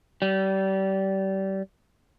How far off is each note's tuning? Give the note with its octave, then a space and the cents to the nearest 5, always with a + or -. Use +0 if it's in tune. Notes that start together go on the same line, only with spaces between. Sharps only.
G3 -30